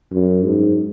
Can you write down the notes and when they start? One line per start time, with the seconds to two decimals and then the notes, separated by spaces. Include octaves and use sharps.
0.12 F#2
0.45 G#2